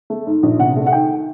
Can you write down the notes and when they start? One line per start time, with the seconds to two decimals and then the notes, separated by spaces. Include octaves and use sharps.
0.10 A3
0.27 G#2
0.43 A#1
0.59 C3 F#5
0.76 A3
0.86 F#5
0.93 D#3 G5